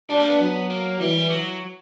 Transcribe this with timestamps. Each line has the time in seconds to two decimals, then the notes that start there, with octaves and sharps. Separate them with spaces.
0.09 G3 D4
0.20 A#3
0.29 B3
0.39 F#3
0.70 A#3
1.00 E3 G3
1.30 F#3